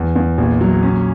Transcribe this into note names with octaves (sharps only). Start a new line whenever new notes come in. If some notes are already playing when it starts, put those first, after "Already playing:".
Already playing: E2
E2
A#1
F#3
C#4